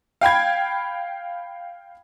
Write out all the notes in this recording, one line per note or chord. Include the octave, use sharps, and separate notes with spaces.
F5 G5 B5 G#6